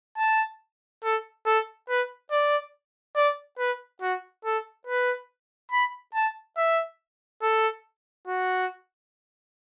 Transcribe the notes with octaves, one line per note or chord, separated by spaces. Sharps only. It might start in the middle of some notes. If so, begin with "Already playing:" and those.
A5
A4
A4
B4
D5
D5
B4
F#4
A4
B4
B5
A5
E5
A4
F#4